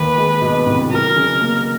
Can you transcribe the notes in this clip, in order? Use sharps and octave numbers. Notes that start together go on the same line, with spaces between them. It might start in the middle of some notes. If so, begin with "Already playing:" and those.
Already playing: D#2 B4
G#3
B2
C2
F#3 A#4
C#3
A#3